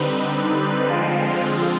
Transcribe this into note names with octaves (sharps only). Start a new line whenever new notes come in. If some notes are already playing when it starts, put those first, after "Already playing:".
Already playing: D3 G3 C4 D#4 B4
D3 F3 G#3 C4 F4